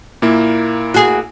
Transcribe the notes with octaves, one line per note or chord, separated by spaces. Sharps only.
A#2 A#3 E4
F#4 G#4